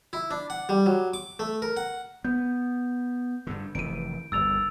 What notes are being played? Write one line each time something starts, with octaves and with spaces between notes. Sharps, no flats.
E4
D4
F#5
G3
F#3
D6
A3
A#4
F#5
B3 G6
G2 D3
F1 D#3 E3 D7 D#7
G1 D#2 E6 A6 F7